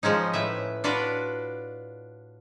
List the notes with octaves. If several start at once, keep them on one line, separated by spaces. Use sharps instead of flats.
F3 G#3 C#4 D#4
A2 B4 E5
D4 F4 F#4 B4 D5